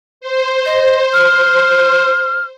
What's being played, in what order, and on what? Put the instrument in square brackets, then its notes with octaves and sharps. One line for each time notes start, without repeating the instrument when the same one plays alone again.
[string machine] C5
[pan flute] D#5
F6